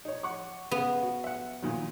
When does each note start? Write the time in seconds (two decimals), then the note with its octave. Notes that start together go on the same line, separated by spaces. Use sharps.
0.05 D#4 C#5
0.23 F#5 C#6 D6
0.71 C#3 B3
1.03 F#4
1.24 E5 F#5
1.62 A#2 D#3 F#3